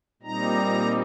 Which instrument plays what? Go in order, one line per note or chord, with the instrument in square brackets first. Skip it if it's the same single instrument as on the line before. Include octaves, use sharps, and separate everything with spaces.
[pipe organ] A#2 G3 C4 D#4 A#5